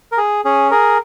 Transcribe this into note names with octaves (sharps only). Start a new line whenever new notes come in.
A#4
G#4
C#4 G#4
G#4 A#4